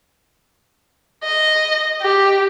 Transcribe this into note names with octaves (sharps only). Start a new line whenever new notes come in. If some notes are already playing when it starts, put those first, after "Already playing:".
D#5
G4